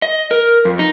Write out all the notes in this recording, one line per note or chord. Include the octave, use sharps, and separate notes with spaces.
D#5
A#4
F2
D#4